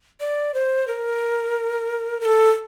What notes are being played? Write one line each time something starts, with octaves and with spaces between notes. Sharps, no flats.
D5
C5
A#4
A#4
A4